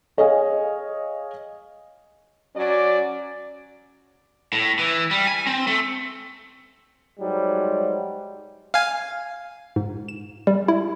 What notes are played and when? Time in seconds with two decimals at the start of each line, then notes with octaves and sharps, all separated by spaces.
0.17 G#4 C#5 D#5 F5 G#5
2.56 F#3 C#4 F#4 D5
4.53 A2
4.79 E3
5.11 G3
5.27 G#5
5.47 C4
5.67 A3
7.19 G#2 F#3 G3
8.74 F5 G#5
9.76 G#2
10.08 E7
10.47 G3
10.68 E4